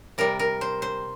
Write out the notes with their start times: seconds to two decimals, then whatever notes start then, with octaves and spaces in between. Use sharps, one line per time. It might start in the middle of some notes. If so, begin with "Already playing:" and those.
0.18 C3 G3 A#4
0.39 A#4
0.61 C5
0.82 C5